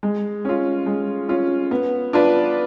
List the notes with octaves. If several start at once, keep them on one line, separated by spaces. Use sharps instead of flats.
G#3
C#4 F4
G#3
C#4 F4
B3
D4 F4 B4 D5